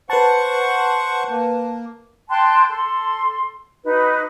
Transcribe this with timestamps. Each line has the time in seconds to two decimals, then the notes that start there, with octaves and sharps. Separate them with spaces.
0.10 B4 C5 F#5 A5 C#6
1.30 A#3
2.30 G5 A5 C6 F#6
2.69 A4 C6
3.84 D#4 F#4 B4